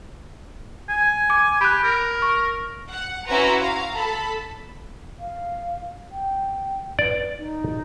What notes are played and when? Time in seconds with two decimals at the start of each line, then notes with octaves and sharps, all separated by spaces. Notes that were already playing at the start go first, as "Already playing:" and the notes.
0.89 G#5
1.30 D6
1.61 G4 B5 F#6
1.83 A#4
2.22 C#6
2.91 F#5
3.26 C#4 E4 F#4 B4 A#5 C6
3.60 F5 A#5
3.96 A4 A5 B5
5.20 F5
6.12 G5
6.99 B4 D5
7.39 D#4